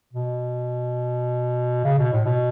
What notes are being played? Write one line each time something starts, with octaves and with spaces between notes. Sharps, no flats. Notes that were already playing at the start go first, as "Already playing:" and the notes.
B2
C#3
B2
A2
B2